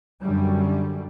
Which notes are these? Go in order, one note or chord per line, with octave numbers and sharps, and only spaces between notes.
F#2 D3 G3